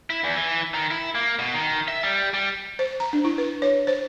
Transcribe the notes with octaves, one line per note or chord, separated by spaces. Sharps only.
E4
E2
E3
D#3
E4
A#3
B2
D#3
E5
G3
G3
C5
A#5
D4
E4
B4
C#5
C5